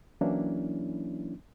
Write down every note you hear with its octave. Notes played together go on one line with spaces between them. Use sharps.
E3 F#3 A#3 C#4 D4 E4